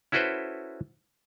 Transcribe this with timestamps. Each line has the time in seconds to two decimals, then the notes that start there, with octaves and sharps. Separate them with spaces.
0.12 C#4 E4 F#4 A4 B4 C5